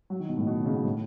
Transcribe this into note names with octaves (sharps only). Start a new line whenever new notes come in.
F#3
D#3
B2
A2
B2
D#3
C#3
B2
A2